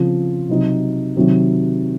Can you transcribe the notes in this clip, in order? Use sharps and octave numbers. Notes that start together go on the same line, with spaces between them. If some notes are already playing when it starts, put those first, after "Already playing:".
Already playing: C#3 F3 C4 F4
C3 F#3 C4 D#4
C3 D#3 F#3 C4